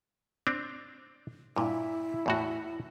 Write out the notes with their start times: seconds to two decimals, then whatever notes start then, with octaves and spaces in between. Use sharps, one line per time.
0.47 C4 D4
1.56 G2 A#2 E4
2.26 E2 A2 F#4